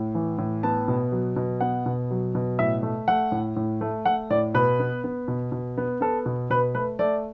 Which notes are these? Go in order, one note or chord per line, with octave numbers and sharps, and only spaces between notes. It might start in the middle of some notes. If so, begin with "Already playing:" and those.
Already playing: A2
E3
A2
B3 A5
B2
F#3
B2
B3 F#5
B2
F#3
B2
A2 E5
A3
A3 F#5
A2
A2
A3
A3 F#5
A2 D5
B2 B4
B3
B3
B2
B2
B3
B3 A4
B2
B2 B4
A3 B4
A3 D5